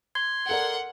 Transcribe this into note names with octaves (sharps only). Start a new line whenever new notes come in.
C6 G#6
A4 A#4 D5 F#5